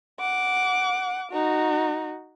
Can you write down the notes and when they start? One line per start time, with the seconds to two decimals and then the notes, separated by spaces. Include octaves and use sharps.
0.20 F#5 D6
1.32 D#4 F#4